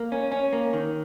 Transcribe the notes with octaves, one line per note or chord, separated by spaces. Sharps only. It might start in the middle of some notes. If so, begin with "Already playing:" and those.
Already playing: A#3
C#4
C#4
A#3
D#3